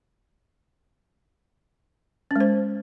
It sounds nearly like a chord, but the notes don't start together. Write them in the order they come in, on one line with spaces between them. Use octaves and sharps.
C#4 G#3 C5